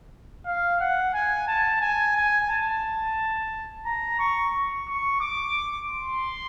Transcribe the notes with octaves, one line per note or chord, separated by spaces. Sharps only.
F5
F#5
G#5
A5
G#5
G#5
A5
A#5
C#6
C#6
D6
C6